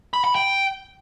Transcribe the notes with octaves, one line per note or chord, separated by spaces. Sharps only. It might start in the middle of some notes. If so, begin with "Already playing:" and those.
B5
B5
G5